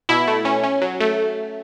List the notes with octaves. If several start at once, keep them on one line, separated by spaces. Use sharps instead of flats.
B2 E4
A3
C#4
C#4
F#3
A3